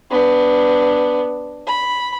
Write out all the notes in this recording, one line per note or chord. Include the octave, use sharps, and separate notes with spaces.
B3 D4
B5